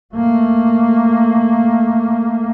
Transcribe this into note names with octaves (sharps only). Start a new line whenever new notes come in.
A3 A#3